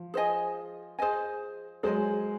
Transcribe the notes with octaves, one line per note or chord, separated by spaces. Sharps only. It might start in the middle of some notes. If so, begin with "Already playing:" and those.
Already playing: F3
G#4 C5 D#5 G#5
G#4 C5 D#5 G#5
F#3 G#3 G#4 C5 D#5 G#5